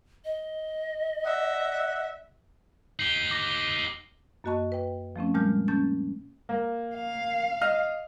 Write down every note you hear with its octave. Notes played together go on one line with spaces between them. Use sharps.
D#5
D5 E5 F#5
D#4 G4 C7 F#7 G7
D6 A#6
F#2 A#3 F#4 D#5 A5 C#6
B4 G5
F3 A3 C4 C#4
A#2 G3 G#3 A5 F6 G6
A#3 C#4 A5 G6 A6
A#3
F5
D#5 F6